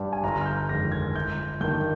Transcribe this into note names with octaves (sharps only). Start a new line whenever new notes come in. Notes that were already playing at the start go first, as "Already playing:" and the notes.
Already playing: G2 G3
G#5
G1 A#5
F6
G6
F2 D#3 G#3 A#6
G#6
G1 G6
G2 D#3 A#3 G6